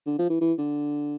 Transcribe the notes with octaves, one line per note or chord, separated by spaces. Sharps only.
D3
F3
E3
E3
D3